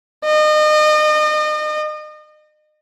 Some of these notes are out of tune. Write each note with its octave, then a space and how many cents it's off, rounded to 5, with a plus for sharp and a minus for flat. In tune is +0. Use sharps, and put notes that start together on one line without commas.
D#5 -35